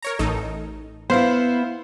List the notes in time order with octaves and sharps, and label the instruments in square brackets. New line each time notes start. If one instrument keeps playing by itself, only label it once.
[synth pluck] A#4 C#5 A#5
A1 D#4 A4
[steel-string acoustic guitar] B3 E4 [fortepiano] C5 F5